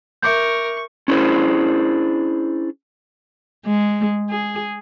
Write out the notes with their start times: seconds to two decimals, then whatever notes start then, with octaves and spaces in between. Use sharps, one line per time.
0.22 A#4 E5 C#6 D6 G6
1.08 C#4 D4 E4 G#4 C5
3.66 G#3
4.30 G#4